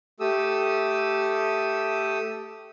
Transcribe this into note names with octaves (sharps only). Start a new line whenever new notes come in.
A3 G4 A4 D#6 E6